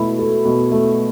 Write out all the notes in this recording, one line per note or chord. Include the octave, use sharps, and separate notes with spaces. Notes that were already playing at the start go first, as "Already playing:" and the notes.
Already playing: B2 A3 E4
A4
B2
A3